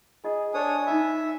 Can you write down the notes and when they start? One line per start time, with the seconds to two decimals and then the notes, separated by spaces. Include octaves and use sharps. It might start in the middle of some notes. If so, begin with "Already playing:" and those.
0.24 F4 G#4 D#5
0.54 D4 A4 C5 C#5 G#5 D#6
0.86 D#4 F4 E5 B5